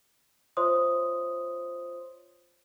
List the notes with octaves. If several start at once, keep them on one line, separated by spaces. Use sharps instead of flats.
F4 C5 C#5 E5 C6 D#6